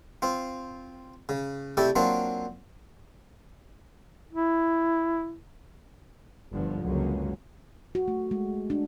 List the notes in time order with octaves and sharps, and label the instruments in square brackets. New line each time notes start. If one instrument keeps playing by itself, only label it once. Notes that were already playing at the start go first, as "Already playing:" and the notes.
[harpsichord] C4 F4
C#3
C3 A3 E4 G4 D5
F#3 A#3 C4 D4 F4
[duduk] E4
[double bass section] G1 G2 D3 F3
C#2 F#2 D3 F#3 A#3 C#4
[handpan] F#4
A3
G#3
D4